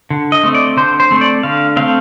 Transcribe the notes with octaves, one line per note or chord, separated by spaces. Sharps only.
D3
D#5
A3 C4
D5
D3 C5
C5
A3 C4
D5
D3 F5
A3 C4 F5